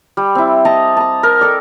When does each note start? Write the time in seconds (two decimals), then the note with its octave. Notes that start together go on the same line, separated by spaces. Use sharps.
0.17 G3
0.35 C4 E4
0.65 D#5 A5 A#5 D#6
0.97 A5 A#5
1.23 A#4
1.41 A4 D5